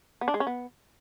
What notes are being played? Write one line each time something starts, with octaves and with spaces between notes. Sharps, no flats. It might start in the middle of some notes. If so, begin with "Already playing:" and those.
B3
D4
G#3
C#4
B3